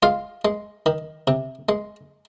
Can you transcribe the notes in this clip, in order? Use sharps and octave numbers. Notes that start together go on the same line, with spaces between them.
G#3 F4 F5
G#3
D#3
C3
G#3